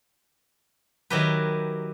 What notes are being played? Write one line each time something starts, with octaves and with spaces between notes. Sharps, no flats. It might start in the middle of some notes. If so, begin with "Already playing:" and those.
D#3 F#3 E4 G4 A#4 B4